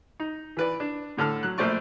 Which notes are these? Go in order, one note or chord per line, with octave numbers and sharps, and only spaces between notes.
D#4
E3 B4 D5
D4
A2 D3 A4 A5 F6
F#3 F#6
A#1 A3 C5 D5 C#6